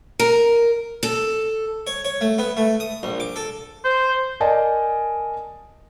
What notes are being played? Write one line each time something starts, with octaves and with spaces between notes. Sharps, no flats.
A#4
A4
C#5
C#5
A3
B3
A3
D#6
A#1
D6
A4
C5
A#4 D5 D#5 G#5 A5